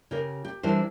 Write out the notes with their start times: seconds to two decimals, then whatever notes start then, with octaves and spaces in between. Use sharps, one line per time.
0.11 C#3 G4 A#4
0.45 G4
0.63 E3 G3 D4 A#4 C5